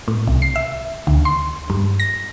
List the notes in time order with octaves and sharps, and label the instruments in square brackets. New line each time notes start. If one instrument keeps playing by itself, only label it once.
[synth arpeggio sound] A2
C2
C7
E5
D2
C6
G2
A#6